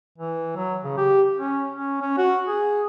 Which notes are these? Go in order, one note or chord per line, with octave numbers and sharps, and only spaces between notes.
E3
F#3
C#3
G4
C#4
C#4
C#4
F#4
G#4